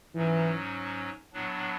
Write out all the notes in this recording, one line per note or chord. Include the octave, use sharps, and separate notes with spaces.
G#2 E3 F#3 C#4
A2 F#3 B3 D4